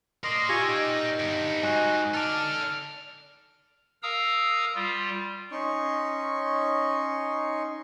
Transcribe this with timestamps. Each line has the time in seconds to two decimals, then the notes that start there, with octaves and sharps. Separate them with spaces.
0.24 A#4 D5 D#5 C6
0.49 F4 G4 G#5 C#6 E6 A#6
0.67 D#4 G5
1.20 G2 B3
1.63 G#2 F#4 D#5 G#5
2.14 A4 D5 A5 F6
4.03 A#4 F5 A#5 D#6 E6
4.75 G3 F4
5.52 C#4 D#4 C6 C#6